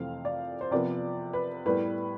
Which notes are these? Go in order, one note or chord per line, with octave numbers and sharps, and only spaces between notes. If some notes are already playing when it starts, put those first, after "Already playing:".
Already playing: F2 C3 E3 A3 C4 F5
D5
C5
C3 F3 B3 D5
B4
A2 G3 B3 B4